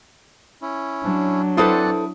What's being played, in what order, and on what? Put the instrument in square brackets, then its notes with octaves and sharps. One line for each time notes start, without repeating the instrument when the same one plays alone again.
[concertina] C#4 E4
[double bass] F#3 D4
[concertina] C4 D5 F#5 [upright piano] E4 D#6 [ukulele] A4 B4 C5